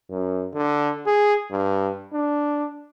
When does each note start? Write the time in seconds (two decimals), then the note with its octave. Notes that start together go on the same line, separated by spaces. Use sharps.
0.11 F#2
0.53 D3
1.07 G#4
1.51 G2
2.13 D4